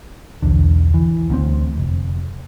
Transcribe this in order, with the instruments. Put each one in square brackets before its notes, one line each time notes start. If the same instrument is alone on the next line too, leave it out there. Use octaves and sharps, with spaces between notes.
[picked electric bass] B1 E2 D3
E3
D2 A#3 C4
F1